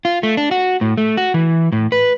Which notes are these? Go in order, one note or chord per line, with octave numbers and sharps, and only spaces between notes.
F4
A3
D4
F#4
A2
A3
F#4
E3
A2
B4